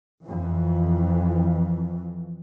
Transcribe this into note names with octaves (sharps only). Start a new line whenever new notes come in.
F2 E3